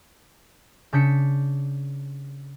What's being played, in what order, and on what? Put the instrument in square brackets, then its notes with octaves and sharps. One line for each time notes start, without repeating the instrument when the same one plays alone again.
[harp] C#3 D4 G6 B6 C#7